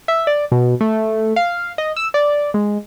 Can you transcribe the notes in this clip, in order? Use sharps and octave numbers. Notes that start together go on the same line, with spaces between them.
E5
D5
B2
A3
F5
D#5
E6
D5
G#3